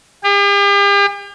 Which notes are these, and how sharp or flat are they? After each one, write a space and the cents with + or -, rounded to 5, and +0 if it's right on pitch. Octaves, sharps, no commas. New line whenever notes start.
G4 +45